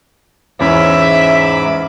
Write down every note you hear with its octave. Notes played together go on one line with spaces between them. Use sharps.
E2 G#2 C#4 E5 B5 D6